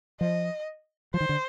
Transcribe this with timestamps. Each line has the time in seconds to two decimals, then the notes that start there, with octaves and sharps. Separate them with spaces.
0.20 F3 D#5
1.14 F3 C5
1.20 D#3
1.29 D3